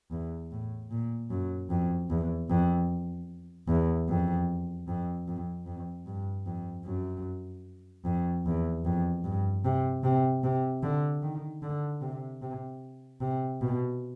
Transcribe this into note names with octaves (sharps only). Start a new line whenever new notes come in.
E2
A2
A#2
F#2
F2
E2
F2
E2
F2
F2
F2
F2
G2
F2
F#2
F2
E2
F2
G2
C3
C3
C3
D3
D#3
D3
C3
C3
C3
B2